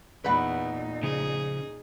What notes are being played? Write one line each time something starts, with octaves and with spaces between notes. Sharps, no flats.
E2 A#2 D#4 B4 F#5
C#3 F3 G#4